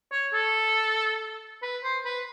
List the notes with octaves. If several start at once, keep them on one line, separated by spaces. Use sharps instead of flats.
C#5
A4
B4
C5
B4